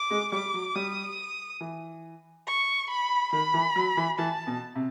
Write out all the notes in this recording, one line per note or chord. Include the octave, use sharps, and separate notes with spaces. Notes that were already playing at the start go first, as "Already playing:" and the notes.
Already playing: D6
G#3
G3 D6
F#3
G3 D#6
E3
C#6
B5
D#3 B5
E3
F#3
E3
E3 A5
B2
C3